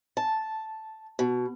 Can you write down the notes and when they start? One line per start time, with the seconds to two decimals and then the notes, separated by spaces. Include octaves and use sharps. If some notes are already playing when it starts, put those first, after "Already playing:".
0.17 A5
1.19 B2